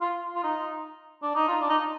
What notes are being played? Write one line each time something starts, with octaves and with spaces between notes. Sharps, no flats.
F4
F4
D#4
D4
D#4
F4
D4
D#4